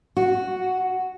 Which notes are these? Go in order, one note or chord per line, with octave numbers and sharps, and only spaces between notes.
F#4